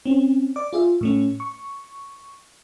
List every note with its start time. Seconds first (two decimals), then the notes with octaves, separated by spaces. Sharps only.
0.06 C4 C#4
0.56 D5 D6
0.73 F4 G#4 E5
1.01 A2 A3 C#4
1.40 C#6